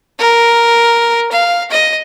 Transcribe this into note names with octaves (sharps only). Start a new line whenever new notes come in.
A#4
F5
D#5